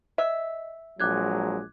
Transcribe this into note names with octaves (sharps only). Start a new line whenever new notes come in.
D#5 E5
A#1 F#3 G#3 D6 F#6 G#6